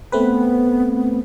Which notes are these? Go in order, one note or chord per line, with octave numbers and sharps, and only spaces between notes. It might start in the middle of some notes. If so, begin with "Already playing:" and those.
A3 B3 C4 B4